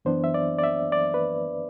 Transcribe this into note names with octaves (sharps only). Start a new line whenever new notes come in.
F#2 E3 B3 D4 C5
E5
D5
D5
E5
D5
B4